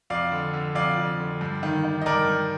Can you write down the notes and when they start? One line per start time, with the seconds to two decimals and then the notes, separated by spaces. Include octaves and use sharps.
0.10 F2 D5 F5
0.32 D3
0.53 D3
0.75 F2 D5 F5
0.97 F2
1.20 D3
1.41 G2
1.63 D#3
1.84 D#3
2.02 D#5
2.06 G2 A#4 D5
2.28 G2